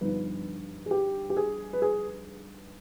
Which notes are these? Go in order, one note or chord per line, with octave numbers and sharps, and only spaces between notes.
G2 D3 F3 B3 D#4 B4
G#4
G4
G4
G#4
B4
G#4